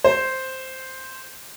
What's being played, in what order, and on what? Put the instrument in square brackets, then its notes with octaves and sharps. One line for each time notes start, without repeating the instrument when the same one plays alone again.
[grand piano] C5